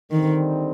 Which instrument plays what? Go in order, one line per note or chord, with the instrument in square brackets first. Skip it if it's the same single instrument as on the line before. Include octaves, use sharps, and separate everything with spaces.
[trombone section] D3 G3 C4 D#4 [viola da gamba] D#3